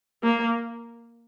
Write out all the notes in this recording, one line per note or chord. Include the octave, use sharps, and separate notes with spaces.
A#3